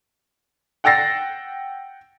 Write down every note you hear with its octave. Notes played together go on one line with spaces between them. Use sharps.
F#5 G5 E6 A6 A#6 C7